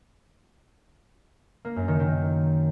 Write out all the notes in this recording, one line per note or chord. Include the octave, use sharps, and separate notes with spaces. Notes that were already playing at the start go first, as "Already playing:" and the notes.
A#3
F#2
D#3
D#3